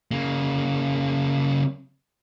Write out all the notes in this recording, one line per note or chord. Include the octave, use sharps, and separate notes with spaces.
C#3 A#3